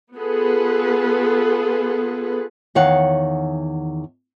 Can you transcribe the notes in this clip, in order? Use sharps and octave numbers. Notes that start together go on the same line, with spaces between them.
B3 F4 G#4 A4 B4
E2 D#3 C#5 F5 F#5